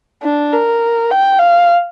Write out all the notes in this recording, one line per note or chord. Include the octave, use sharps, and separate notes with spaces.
D4
A#4
G5
F5